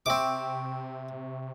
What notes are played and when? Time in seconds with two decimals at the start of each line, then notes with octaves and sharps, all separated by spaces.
0.06 C3 C4 E5 G5 C#6 D6